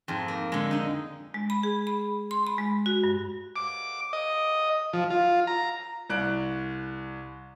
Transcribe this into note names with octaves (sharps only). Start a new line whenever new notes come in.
F2 G#2
A#3
D3 G#3
D3 D#4
G#3
B5
G#4
B5
C6
B5
G#3
F#4
G2
D6
D#5
F3
F4
A#5
C2 F#6 D7